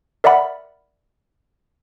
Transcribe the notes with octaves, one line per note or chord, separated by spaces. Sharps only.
A#4 D5 E5 F#5 B5